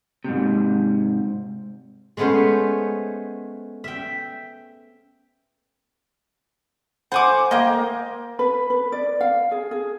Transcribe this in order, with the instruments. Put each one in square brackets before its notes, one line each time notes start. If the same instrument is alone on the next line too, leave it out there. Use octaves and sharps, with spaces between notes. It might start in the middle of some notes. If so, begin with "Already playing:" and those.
[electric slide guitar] G#2 C3
[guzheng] G#3 A3 B3 C#4 C5
E5 G5
[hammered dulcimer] C5 [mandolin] F#5 G#5 D6
[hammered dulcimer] A#3 [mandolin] D#5 G5
[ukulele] B4
B4
D5
F5
G#4
G#4